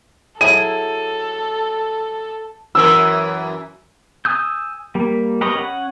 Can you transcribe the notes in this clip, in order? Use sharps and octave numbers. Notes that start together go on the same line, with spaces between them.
F#3 E4 G#4 A4 D#7
F#2 E3 A#4 E6
G#5 D#6 E6 G6
G3 A#3
G4 A#4 B4 C#5 D#5
C#4 F#5